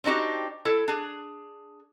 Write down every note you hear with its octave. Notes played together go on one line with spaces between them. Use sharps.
C4 D4 D#4 F#4 G4
E4 A4
D4 G#4